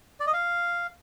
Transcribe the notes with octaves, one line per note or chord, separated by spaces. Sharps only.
D5
D#5
F5